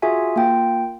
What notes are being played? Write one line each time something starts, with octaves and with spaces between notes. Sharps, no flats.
F4 F#4 G#4 E5 G#5
A#3 F4 G5